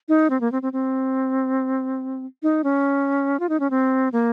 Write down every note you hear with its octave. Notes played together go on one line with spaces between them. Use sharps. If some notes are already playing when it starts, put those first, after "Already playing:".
D#4
C4
A#3
C4
C4
C4
D#4
C#4
F4
D#4
C#4
C4
A#3